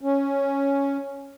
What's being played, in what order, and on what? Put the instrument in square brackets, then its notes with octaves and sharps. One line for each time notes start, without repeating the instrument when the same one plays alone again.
[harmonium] C#4